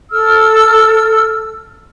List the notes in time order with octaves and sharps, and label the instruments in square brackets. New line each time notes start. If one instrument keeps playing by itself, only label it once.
[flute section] A4 E6 F6